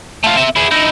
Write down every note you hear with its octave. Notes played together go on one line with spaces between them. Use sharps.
A3 F4
C4 E5
E4 G#4
D#4 E4